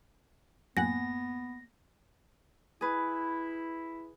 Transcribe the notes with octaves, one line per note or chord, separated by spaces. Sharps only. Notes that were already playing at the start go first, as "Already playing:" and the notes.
F#2 A2 A#3 B3 F#5 G#5 A#6
E4 G#4 B4